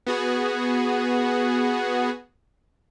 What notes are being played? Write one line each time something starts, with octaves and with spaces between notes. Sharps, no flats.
B3 F#4 G#4